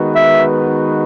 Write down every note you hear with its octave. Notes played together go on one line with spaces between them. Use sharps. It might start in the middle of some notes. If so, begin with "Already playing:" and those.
Already playing: D#3 G#3 B3 F#4 B4
E5